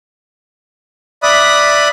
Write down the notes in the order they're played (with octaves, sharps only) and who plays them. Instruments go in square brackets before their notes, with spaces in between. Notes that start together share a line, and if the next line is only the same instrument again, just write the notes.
[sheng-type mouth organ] D5 E5 B5 D#6 F#6